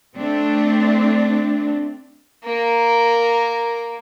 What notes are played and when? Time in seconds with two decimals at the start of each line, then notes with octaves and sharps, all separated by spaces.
0.15 A3 C4 D4
2.44 A#3 A#4